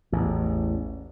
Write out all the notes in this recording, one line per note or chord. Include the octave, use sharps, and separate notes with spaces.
A1 E2